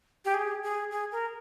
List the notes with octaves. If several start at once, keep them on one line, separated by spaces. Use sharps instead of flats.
G4
G#4
G#4
G#4
A#4